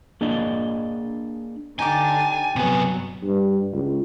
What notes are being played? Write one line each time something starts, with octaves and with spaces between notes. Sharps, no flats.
A#3 D4 G#4 D5 D#5
D3 D4 D#4 G4 G#5 D6 A6
G2 C3 F#3 B3 G#4
G2
C#2